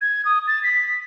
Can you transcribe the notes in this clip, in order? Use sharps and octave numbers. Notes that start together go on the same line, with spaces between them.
G#6
D#6
A6
B6